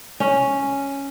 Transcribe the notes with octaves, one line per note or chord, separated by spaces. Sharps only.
C#4